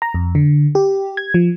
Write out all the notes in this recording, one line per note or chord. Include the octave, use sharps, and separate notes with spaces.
A#5
F2
D3
G4
G#6
F3